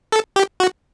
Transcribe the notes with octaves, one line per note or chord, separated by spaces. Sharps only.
A4
G4
F#4